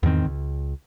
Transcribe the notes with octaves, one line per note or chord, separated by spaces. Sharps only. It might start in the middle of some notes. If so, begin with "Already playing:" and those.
E2 G#2 D#3 C4
C#2